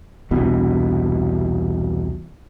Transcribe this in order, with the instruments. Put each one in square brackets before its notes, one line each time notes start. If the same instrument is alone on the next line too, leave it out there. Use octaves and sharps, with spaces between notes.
[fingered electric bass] E1 C2 B2 E3